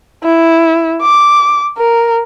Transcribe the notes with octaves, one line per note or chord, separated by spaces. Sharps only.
E4
D6
A#4